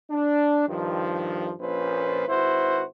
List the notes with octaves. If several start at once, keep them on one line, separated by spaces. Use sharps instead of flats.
D4
G2 D#3 F3
A#1 A#2 F3 C#4 B4 C5
G#1 E4 F#4 B4 C5